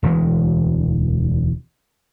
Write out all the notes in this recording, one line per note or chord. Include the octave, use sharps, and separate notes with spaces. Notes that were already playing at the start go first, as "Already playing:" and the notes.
E1 D2 E3 G#3